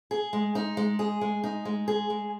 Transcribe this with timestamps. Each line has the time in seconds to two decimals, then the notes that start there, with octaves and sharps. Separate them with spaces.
0.11 G#4
0.33 G#3
0.55 D#4
0.77 G#3
0.99 G#4
1.21 G#3
1.44 D#4
1.65 G#3
1.88 G#4
2.10 G#3